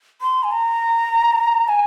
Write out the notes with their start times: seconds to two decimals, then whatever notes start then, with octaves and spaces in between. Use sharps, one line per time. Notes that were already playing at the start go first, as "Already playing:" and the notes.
0.21 C6
0.44 G#5
0.51 A#5
1.68 G#5